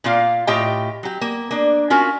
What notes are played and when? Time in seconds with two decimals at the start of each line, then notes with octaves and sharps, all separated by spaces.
0.04 A#2 A#3 F4 F5
0.47 A2 F4 G4 D#5 G5
1.03 F#3 G4
1.21 A#3
1.51 A#3 D4
1.90 C#4 F4 F#4 A#4